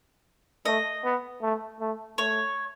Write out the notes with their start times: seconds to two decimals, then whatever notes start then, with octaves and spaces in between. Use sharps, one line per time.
0.65 A3 D#5
1.04 B3
1.42 A3
1.80 A3
2.18 A3 C#5